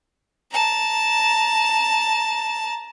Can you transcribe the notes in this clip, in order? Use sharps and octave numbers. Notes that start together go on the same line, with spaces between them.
A5 A#5